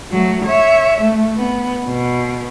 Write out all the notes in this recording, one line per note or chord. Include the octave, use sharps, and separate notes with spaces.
F#3 A3
C#5 E5
A3
B3
B2